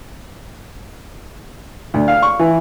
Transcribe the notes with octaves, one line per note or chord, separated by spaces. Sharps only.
D2
F5
C#6
E3